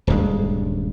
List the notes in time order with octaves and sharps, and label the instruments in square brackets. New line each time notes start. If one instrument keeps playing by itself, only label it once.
[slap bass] D#1 D2 G2 G#3